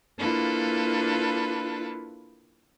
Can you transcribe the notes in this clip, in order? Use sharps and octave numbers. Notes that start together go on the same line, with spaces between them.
A#3 D4 E4 F4 A4 B4